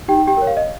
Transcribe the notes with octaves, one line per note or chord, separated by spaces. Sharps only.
D#4 G4 G5
G4 G5
A#4 C#5
F5
D#5